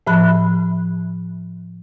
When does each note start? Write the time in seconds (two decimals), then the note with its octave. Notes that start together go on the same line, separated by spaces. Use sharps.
0.07 A2 F3 B5 F#6